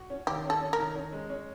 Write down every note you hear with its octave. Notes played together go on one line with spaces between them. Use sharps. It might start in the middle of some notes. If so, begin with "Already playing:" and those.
Already playing: F#4
C#4
D#3 G4
C#4
A4
C#4
A#4
D#3
C#4
G#3
C#4